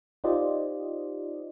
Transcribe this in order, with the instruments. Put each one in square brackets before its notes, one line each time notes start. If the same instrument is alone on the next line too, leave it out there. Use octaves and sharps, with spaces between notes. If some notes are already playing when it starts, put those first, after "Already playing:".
[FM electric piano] D#4 F4 G4 C5 D5 D#5